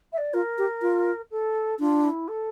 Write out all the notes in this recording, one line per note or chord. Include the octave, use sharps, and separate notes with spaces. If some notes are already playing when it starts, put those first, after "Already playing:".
E5
D5
F4 A#4
G4
F4
A4
D4 F4
E4
A4